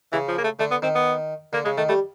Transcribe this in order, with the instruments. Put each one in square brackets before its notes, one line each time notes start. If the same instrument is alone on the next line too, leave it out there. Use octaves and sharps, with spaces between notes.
[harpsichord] C#3 [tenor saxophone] E3
[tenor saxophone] F3
A#3
A3
[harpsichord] D3 [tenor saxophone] A3
[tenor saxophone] B3
[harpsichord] D#3 [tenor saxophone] C4
[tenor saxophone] B3
[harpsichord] D3 [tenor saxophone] A#3
[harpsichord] C#3 [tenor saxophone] G#3
[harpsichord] D#3 [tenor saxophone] A3
[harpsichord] G3 [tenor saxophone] A3